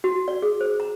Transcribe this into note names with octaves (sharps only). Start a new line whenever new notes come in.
F#4
D5
G#4
C5
A#5